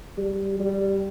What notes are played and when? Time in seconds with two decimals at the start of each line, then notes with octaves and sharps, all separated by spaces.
0.18 G3
0.60 G3